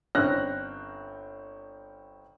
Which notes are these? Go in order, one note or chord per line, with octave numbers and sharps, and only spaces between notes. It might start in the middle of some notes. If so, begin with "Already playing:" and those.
G1 C4 C#4 F6 F#6 A#6